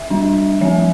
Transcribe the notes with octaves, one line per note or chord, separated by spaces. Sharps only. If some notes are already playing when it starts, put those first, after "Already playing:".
Already playing: E5
G3 D4
F3 C4 E5